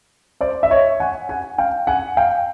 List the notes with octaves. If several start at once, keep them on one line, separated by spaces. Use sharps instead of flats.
C5 D5
E5
C#5 D#5
F#5 G#5
F#5 G#5
F5 G5
F#5 G#5
F5 G5